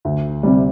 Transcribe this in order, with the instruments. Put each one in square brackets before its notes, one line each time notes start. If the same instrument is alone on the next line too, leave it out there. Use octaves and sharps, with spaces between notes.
[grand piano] D2
C3 G3